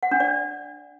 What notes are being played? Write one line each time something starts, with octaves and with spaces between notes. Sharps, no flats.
F#5
D4
D5